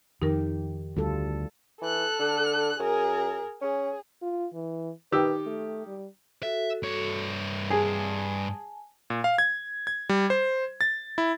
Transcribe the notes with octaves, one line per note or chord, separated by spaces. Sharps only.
F2 D#3 D#4 G4 A#4
D2 G3 F4 A4
E3 A4 F#6
D3
F#2 G#4 A#4
C#4 G#4
F4
E3
D#3 G4 B4 E6
A3
G3
F#4 A4 E5
G2 C#5
G#4 G#5 A5
A#2
F5
G#6
G#6
G3
C5
A6
E4